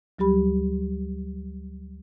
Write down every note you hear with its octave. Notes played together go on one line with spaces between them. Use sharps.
D2 F#3 G3 G4 B5